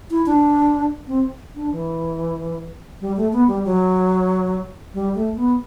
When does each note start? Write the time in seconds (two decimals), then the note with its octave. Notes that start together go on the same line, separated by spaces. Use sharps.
0.11 E4
0.26 D4
1.07 C4
1.55 D4
1.72 E3
3.01 G3
3.17 A3
3.33 B3
3.48 G3
3.65 F#3
4.94 G3
5.15 A3
5.36 B3